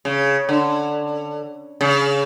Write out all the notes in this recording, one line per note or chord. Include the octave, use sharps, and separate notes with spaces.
C#3
D3
C#3